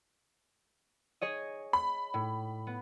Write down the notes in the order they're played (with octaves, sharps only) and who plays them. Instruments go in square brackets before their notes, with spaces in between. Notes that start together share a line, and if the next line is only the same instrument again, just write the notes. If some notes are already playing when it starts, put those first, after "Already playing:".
[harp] G#4 C#5 D#5
[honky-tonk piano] B5
[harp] A2
B3